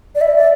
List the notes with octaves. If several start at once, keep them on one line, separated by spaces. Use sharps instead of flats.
D5
E5
D5